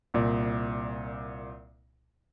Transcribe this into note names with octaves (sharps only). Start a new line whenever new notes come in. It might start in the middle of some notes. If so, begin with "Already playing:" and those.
C2 A#2 D5